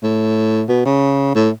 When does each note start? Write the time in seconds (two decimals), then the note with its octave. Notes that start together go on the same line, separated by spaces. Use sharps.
0.03 A2
0.69 B2
0.86 C#3
1.35 A2